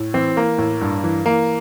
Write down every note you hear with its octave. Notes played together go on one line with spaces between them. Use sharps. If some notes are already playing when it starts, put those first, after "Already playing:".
Already playing: A2
E3 C4
E3 A#3
A2
G2
E3
E3 A#3